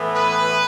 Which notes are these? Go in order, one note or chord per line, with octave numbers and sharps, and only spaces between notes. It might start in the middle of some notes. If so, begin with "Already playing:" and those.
Already playing: A2 E3 B3
B4